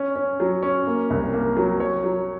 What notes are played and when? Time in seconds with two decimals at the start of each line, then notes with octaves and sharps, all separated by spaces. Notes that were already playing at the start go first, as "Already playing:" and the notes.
Already playing: C#4
0.16 C#4
0.40 F#3
0.62 C#4
0.87 A#3
1.10 C2
1.33 A#3
1.57 F#3
1.80 C#5
2.04 F#3